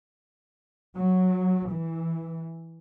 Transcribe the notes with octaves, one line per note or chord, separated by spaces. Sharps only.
F#3
E3